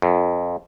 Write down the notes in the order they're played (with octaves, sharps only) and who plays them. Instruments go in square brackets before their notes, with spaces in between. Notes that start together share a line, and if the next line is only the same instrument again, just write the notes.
[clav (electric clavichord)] F2